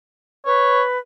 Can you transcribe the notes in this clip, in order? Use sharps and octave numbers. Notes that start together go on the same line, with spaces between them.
B4 C#5